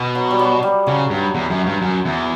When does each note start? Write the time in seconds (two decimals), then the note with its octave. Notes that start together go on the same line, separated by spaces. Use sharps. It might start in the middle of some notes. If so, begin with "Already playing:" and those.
Already playing: B2 B3
0.15 F#3
0.31 G3
0.39 F#3
0.63 G3
0.86 C#3 F#3
1.10 G2
1.35 E2
1.50 F#2
1.66 G2
1.82 F#2
2.05 E2